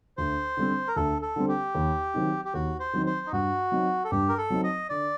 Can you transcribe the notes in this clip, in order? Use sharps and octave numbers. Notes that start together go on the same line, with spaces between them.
D2 C5
D3 G3 C4
A#4
D2 A4
A4
D3 G3 C4
G4
D#2
D#3 F#3 C4 D#4
G4
D#2 F#4
C5
D#3 F#3 C4 D#4
C5
D#4
G2 F#4
F#3 C4 D#4
A4
G2 G4
A#4
A4
F#3 C4 D#4
D#5
D3 D5